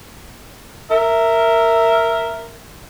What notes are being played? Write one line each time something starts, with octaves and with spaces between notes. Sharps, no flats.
A#4 E5